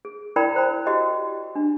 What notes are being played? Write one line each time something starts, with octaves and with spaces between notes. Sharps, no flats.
G#4
E4 A#4 D5 G5 B5
C5 B5
F#4 G4 D#5
D4